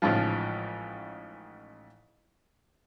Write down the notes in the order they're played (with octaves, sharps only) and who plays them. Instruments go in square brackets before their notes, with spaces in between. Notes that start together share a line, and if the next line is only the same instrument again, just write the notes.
[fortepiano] A1 G#2 C#3 F3